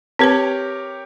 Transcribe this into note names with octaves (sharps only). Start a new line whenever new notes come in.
C4 G4 A#4 B4 C#5 A5